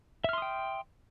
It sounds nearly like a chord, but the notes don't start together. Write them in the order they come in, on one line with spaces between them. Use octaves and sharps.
E5 F6 C6 D#6 G5